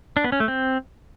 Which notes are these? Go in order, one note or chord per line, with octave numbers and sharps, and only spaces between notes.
D4
B3
C#4
A3
C4